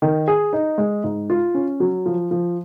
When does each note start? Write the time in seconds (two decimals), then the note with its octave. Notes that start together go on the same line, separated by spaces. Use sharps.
0.02 D#3
0.28 G#4
0.53 D#4
0.78 G#3
1.04 G#2
1.30 F4
1.55 C#4
1.80 F#3
2.06 F3
2.31 F3